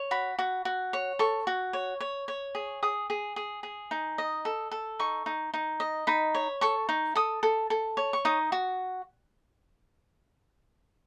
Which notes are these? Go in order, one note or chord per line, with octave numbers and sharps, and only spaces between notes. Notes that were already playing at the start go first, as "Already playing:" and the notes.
Already playing: C#5
F#4 B5
F#4
F#4
C#5
A4 C#6
F#4
C#5
C#5
C#5
G#4
G#4 D#6
G#4
G#4
G#4
D#4
D#5
A4
A4
D#4 C#6
D#4
D#4
D#5
D#4 B5
C#5
A4 C#6
D#4
A4 D#6
A4
A4
C#5
C#6
D#4 D#6
F#4